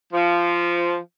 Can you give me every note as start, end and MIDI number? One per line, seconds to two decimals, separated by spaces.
0.13 0.96 53